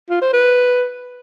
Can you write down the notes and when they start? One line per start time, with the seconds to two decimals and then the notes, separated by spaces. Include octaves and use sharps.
0.10 F4
0.21 C5
0.33 B4